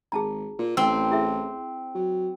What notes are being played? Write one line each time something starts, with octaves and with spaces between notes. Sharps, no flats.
G#1 G#4 A5 A#5
A#2
A1 C4 G5 E6
E4 G#4 E5
F#3